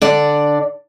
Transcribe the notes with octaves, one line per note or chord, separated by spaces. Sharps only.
D3 D5